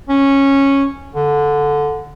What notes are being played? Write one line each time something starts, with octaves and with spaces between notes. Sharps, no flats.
C#4
D3